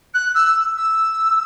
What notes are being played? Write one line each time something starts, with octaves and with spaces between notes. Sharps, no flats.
F#6
E6
E6